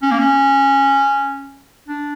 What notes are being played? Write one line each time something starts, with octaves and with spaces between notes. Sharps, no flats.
C#4
A#3
C#4
D4